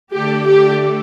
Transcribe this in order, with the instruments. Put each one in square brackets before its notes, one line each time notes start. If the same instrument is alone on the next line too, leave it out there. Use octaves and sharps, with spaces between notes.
[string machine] D3 A3 D4 A4 [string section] G4
[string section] G4